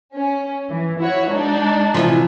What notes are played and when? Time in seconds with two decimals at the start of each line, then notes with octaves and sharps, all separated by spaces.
0.14 C#4
0.70 E3
1.01 E4 F#4 C#5
1.30 G#3 D4 D#4
1.94 C3 E3 F3